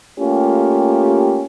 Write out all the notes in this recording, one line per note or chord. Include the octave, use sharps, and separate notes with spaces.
A3 A#3 C#4 F4 G4